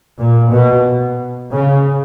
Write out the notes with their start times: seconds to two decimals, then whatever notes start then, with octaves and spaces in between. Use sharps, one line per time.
0.19 A#2
0.52 B2
1.53 C#3